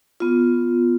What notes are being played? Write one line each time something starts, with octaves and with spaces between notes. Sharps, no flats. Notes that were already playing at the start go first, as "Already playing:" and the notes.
B3 F4